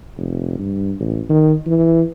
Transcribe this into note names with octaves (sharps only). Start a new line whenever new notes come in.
F1
G2
A1
D#3
E3